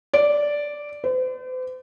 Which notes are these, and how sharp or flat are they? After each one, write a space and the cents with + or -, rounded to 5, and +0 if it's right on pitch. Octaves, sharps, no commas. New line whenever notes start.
D5 -5
C5 -45